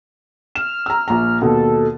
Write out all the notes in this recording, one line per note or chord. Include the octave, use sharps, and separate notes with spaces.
F6 E7
A#5 E6
A#1 A#5
D#2 B2 A4